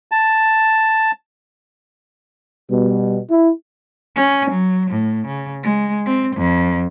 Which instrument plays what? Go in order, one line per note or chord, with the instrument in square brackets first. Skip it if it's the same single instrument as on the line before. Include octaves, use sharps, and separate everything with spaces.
[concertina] A5
[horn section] B2 G3
E4
[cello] C#4
F#3
A2
C#3
G#3
C4
F2